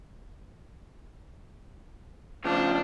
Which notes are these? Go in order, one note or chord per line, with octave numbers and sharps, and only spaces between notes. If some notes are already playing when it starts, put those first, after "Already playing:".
A2 C#3 F3 D4 C5